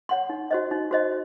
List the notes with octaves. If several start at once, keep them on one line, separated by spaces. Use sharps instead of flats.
C#5 F#5 C6
D#4
F#4 C5 D#5
D#4
F#4 C5 D#5